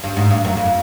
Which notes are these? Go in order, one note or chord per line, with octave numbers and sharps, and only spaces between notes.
G2
G#2
G2
F#2
F2